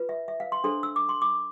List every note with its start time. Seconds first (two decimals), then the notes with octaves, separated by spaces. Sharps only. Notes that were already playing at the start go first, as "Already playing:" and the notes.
Already playing: F4 B4
0.09 E5
0.28 E5
0.40 F5
0.52 C6
0.64 D4 A4 C5 C6
0.83 E6
0.96 D6
1.09 C6
1.22 D6